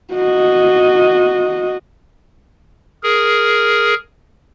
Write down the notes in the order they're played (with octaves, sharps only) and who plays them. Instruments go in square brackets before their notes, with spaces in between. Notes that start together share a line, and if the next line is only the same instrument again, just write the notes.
[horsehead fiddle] F#4 D#5
[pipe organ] G#4 A#4